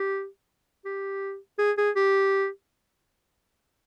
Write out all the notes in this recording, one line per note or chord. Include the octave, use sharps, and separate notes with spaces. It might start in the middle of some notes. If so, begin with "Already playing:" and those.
Already playing: G4
G4
G#4
G#4
G4